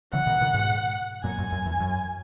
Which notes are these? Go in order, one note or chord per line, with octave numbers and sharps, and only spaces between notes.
C#3 E3 F#5
B2 D#3
B2 D#3
G#2 B2
F#2 A#2 G#5
F#2
F#2
E2
F#2